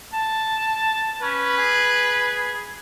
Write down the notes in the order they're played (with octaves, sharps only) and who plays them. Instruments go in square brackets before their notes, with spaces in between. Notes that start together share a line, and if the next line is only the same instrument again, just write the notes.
[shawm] A5
[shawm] C#4 [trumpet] B4
[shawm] G#4